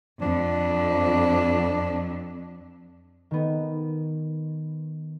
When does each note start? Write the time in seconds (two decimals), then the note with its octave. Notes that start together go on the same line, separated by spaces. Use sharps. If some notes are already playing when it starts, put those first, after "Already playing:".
0.22 F2 D4
3.31 D#3 B3